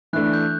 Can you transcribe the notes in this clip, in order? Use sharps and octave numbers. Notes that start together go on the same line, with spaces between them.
E3 A3 D4 F#6
G6